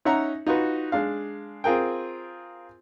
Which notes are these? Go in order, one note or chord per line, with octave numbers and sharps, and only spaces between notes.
C#4 D#4 E5 F#5 A#5
D#4 F4 F#4 B4
G#3 D4 F5
C4 F4 G#4 A#4 G5